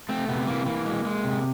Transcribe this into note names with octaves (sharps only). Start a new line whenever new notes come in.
A3 C4
C3 B3
E3 A#3
E3 A#3
G#3
G#3
C3